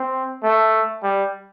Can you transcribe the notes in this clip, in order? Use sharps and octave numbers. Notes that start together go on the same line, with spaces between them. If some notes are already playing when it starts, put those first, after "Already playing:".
Already playing: C4
A3
G3